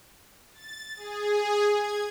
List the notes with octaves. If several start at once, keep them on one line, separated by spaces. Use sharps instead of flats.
A6
G#4
G#6